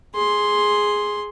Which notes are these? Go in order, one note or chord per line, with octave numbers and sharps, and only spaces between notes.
G#4 C6